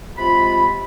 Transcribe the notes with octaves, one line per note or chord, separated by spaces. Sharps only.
C3 G#3 F4 B5